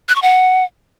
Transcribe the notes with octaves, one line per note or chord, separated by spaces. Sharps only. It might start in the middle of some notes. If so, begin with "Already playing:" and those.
F#6
C#6
F#5